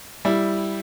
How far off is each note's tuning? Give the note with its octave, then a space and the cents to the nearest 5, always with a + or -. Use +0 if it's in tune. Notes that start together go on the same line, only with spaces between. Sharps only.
G3 +0 E4 +0